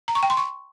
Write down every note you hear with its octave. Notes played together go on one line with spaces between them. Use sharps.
A#5
C#6
G5
C6
C#6